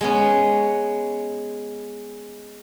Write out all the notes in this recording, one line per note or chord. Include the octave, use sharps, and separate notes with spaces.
G#3 B3 C#4